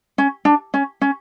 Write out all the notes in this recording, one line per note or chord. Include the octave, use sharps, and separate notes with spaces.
C#4
D4
C#4
C#4